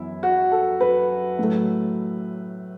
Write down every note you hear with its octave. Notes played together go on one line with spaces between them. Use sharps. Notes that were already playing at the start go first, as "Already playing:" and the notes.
Already playing: F#2 E3 B3 E4
F#4
A4
B4
A2 F#3 A3